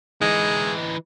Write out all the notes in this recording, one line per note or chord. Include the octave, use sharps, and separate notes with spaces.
E3 G#3 D#4